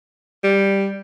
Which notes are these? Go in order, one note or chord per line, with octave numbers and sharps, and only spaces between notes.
G3